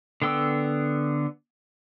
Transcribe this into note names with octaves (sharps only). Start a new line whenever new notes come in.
D3 B3 G5 E6